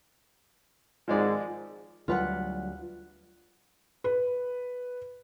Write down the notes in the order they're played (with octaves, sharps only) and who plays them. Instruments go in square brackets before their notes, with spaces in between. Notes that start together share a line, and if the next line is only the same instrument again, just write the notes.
[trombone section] G#1 G#2 [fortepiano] F3 G#3 D5
[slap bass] D2 F#3 G3 [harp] F4 B4 F#5
[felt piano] B4